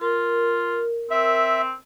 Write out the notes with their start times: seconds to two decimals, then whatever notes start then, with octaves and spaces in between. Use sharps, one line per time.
0.01 F4 A#4
1.11 C4 E5